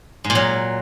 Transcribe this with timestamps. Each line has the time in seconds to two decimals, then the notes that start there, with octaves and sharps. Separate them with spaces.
0.24 G#2
0.30 A#2
0.35 F#3